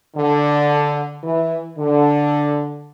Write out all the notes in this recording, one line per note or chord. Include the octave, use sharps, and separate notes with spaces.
D3
E3
D3